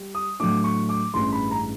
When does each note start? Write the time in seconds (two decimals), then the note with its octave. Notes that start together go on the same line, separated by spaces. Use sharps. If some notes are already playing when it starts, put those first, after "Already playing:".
Already playing: G3
0.15 D#6
0.39 A2 F#3 A3 D4 D6
0.64 C#6
0.89 D6
1.14 A1 G2 E3 G#3 C#4 C6
1.32 B5
1.51 A#5